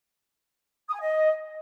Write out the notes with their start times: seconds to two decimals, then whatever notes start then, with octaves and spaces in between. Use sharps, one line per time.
0.88 D#6
0.94 G#5
1.00 D#5